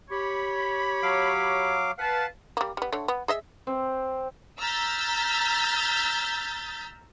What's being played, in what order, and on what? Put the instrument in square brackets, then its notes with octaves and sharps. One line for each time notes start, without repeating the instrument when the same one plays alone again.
[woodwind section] G4 C#5 B5
[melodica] F#3 F5 D6
[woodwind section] B4 F5 A5 [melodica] F#5
[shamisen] G3 A#3
G3 B3
D3 A3 C#5
B3
G#4 D#5 E5
[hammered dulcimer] C4
[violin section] A#5 E6 F6 G6 A6 B6